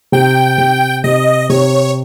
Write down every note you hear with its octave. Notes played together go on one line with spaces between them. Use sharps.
C3 G5
C3
C3 D#5
C3 C#5